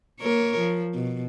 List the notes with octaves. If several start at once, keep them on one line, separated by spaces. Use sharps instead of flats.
A#3 A#4 C#5
F3
B2